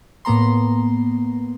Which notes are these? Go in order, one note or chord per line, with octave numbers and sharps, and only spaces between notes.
A2 A#3 B3 A#5 C6